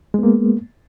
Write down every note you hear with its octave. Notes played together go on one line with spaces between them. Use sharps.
G#3 A#3 B3